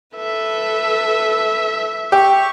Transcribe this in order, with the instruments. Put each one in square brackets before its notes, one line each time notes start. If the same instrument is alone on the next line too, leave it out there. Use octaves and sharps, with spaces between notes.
[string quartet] A4 B4 [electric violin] E5
[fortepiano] G4 [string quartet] C#6